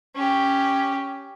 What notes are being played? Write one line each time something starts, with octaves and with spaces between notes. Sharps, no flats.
C#4 G4